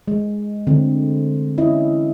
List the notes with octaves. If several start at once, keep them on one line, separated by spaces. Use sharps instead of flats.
G#3
D3 C4
C#4 E4 D#5